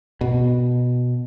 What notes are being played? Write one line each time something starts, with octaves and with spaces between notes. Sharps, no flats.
B2